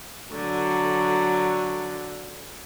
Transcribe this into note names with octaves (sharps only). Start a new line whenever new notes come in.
D3 F#3